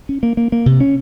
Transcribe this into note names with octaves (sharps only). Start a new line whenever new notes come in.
C#4
A#3
A#3
A#3
C3
C#4